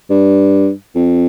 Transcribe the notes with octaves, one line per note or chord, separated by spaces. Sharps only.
G2
F2